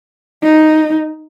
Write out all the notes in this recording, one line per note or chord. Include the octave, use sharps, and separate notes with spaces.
D#4